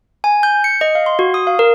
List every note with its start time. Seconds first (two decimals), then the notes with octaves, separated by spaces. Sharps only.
0.24 G#5
0.43 G6
0.64 C#7
0.81 D#5
0.95 F5
1.06 C6
1.19 F#4
1.34 D#6
1.47 F5
1.59 A#4